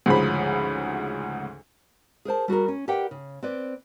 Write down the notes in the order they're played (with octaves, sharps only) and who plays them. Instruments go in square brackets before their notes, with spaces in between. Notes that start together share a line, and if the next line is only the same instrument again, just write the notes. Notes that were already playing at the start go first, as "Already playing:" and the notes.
[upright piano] D2 G#2 C#3 F3 B5
[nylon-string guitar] G#4 A#4 C5 A5
G3 F#4 G#4 A#4
C#4
G4 A#4 B4 D5 F#5 G5
C#3
C4 B4 D5